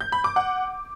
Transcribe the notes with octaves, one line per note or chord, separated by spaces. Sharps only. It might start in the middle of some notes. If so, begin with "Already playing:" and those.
G6
B5
D6
F#5